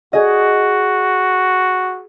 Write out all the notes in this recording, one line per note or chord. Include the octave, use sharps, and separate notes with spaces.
F#4 G#4 D#5